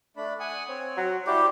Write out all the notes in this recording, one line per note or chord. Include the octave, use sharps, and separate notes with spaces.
A3 D4 B5
F#5 G#5 D#6
C4 C#5
F#3
G3 E4 F#4 G4 C5